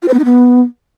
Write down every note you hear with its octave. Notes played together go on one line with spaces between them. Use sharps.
F4
C5
B3
D#4
B3